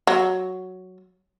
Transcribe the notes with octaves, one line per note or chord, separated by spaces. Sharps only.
F#3